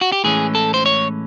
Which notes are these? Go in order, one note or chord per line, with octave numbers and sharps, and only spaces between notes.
F#4
G4
A2 E3 G#3 C#4 G#4
A4
C5
C#5